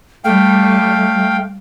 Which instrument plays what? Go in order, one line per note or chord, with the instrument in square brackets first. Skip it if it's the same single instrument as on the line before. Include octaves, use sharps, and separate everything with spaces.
[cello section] G3 [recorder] A3 [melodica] F5 G5